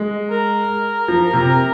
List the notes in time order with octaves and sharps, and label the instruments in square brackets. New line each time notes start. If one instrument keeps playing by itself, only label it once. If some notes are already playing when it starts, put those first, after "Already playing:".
Already playing: [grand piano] G#3
[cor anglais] A#4
[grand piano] F3
C3